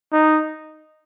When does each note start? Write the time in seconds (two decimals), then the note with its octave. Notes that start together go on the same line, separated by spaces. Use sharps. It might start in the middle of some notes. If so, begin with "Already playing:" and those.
0.13 D#4